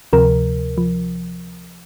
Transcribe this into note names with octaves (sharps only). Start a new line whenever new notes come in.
D2 C3 F3 A#4
F3